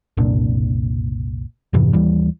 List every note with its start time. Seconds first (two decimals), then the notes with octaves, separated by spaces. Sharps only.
0.17 F#1 C2 A#2 D4
1.73 F2 G#2 C3 E3
1.93 D#2 E3 G3